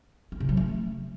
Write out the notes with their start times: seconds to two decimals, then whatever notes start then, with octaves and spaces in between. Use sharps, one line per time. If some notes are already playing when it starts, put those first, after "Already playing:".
0.32 D#4
0.40 C3
0.49 F#3
0.57 A3